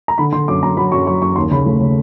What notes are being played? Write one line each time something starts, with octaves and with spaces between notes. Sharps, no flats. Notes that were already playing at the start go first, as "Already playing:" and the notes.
A#5
D3 B5
D3 C6
F#2 D6
F#2 A#5
F#3 B5
F#2 C#6
F#3 C#6
F#2 C#6
D#2 C6
C#3 B5
A3
C#3